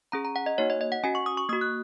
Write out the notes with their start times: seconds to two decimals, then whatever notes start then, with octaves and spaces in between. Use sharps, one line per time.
0.12 C#4 G#4 A#5
0.25 A#5
0.36 F#5
0.46 D#5
0.58 A#3 D#4 F#4 C#5
0.70 D#5
0.81 D#5
0.92 F#5
1.03 C#4 F#4 G#5
1.15 C#6
1.26 D#6
1.37 C#6
1.49 A#3 F#4 D#6
1.61 F#6